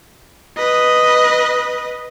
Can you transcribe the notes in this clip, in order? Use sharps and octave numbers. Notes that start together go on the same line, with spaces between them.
B4 D#5